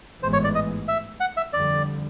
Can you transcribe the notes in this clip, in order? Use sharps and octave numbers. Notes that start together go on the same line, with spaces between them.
A1 G#2 E3 G#3 B3 C5
C#5
D5
D#5
E5
F#5
E5
F2 D3 G3 D5